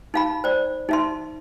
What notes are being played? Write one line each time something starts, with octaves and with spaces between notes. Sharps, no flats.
D#4 F5 B5
C5 D5
D#4 E5 C6